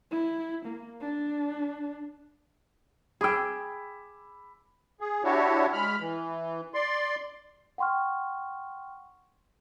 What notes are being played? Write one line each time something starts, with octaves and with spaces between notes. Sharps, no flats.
E4
A#3
D4
G#4 G5 B5 D6 E6
G#4
D4 E4 F#4 G4 C#5
G#3 B5 F6
E3
D5 C6
F#5 G5 C6 C#6 F6